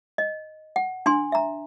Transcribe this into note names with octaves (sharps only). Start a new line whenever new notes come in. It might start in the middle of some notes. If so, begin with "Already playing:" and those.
D#5
F#5
D4 G#5 C6
E5 A#5